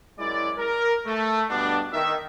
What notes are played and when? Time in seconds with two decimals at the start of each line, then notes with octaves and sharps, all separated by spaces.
0.19 F#2 G#3 E4 D5
0.58 A#4
1.07 A3
1.50 G2 B2 B3 D4
1.93 D#3 E5